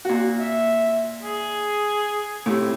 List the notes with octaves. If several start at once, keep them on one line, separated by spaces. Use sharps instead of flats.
A#2 F#4
E5
G#4
A2 C3